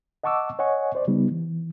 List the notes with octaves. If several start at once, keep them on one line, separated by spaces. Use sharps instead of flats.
D#5 F#5 A5 C#6 D6 E6
C#5 D#5 F#5 G#5 C#6
C5 D5
C#3 G3 B3 D#4
E3